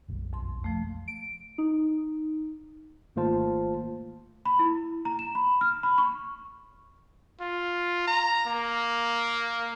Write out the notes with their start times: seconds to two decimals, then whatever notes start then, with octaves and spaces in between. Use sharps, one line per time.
0.08 F#1 B1 F#2
0.33 F2 C6
0.64 F3 A3
1.08 D7
1.58 D#4
3.16 G#1 A3 A#3 F4 C5 A5
4.46 B5
4.59 E4
5.05 A#5
5.19 E7
5.35 B5
5.61 F6
5.83 B5
5.98 C#6
7.40 F4
8.07 A#5
8.46 A#3